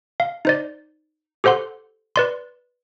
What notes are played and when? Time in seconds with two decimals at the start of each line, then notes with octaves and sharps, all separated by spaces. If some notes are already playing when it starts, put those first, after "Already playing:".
0.20 F5
0.45 D#4 C5 D5
1.44 G4 A4 C5 F#5 C6
2.16 B4 D5 C6